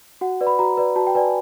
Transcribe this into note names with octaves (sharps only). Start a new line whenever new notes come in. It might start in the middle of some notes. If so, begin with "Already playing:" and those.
F#4 F#5
B4 D5
B5
F#4 A#5
B4 D5
F#4 A5
G5
B4 D5 G#5